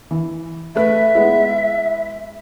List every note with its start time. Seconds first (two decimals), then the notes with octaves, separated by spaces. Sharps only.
0.11 E3
0.76 A3 B4 E5
1.15 G#3 B3 E4